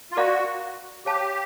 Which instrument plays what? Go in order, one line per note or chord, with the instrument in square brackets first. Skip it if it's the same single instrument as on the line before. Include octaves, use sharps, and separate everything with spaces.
[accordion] F4
[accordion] F#4 [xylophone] A#4 D5 F5 A#5 D6
[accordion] G4 [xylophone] C#5 F5 A5